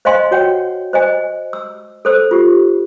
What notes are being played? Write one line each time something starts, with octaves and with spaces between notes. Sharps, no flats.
C5 D#5 F5 G#5 C6
F#4 C#5 F#5 G5
C5 D#5 G#5
E6
A4 C5 E6
F4 G4